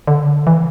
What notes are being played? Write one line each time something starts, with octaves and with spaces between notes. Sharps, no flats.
D3
E3